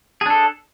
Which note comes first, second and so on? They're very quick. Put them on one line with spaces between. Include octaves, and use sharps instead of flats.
G#4 D4 A4